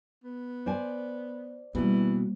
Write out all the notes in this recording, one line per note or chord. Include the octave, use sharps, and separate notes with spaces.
B3
C5 D5 G#5
B2 E3 G3 A#3